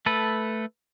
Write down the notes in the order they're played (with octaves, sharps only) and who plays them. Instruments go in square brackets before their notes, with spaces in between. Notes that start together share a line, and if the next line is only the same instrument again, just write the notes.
[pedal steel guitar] A3 A4 B4